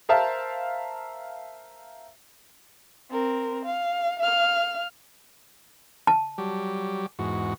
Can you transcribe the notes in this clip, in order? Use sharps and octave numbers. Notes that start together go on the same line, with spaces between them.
A#4 C5 E5 F5 A5
C4 A#4
F5
F5 F6
A5
F#3 G3 G4
E2 G#2 F#4